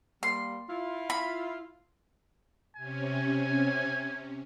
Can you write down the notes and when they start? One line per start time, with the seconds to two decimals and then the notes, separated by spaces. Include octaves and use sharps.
0.23 G3 A#3 C6
0.69 E4 F4
1.10 B5
2.76 C3 C#4 G#5